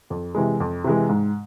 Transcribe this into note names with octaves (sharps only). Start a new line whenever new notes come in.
F2
C3 E3 G#3
F2
C3 E3 G#3
G#2